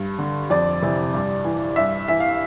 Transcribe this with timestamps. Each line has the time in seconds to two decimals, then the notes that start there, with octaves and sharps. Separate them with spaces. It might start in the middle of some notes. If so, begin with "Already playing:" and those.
Already playing: G2
0.19 D3
0.50 F2 D5
0.82 C3 E3
1.14 G2
1.45 E3
1.76 G2 E5
2.08 E3 E5
2.20 F5